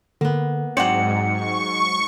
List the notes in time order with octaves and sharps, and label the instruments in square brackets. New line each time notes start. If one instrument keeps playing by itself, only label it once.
[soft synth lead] D3 [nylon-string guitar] A#3 B3
[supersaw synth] G#2 [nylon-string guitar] F#3 D#4 D5 [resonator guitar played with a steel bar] C4 F#5 [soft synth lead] C#7
[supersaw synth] C#6